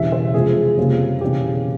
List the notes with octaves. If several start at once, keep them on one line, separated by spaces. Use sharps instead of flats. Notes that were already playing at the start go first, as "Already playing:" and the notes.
Already playing: E1 E2 C#3 G3 E5
C5
F1 F2 C#3 F3 G#3 G#4
F1 F2 C#3 G3 A#3
E1 E2 C#3 G4